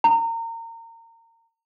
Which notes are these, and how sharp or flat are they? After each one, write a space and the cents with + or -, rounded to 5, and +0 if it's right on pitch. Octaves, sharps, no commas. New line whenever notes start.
A#5 -30